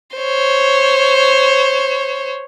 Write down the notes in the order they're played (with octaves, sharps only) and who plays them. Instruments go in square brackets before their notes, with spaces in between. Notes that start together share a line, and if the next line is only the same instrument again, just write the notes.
[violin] C5 C#5